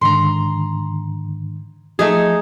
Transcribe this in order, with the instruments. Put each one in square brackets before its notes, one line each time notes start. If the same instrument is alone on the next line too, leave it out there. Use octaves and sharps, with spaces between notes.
[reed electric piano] G#2 D3 D#3 [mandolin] A#5 C6
[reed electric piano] F3 [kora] A3 D#4 G#4